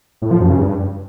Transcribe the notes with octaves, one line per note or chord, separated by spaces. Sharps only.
A2
F3
F#2
C#3
G2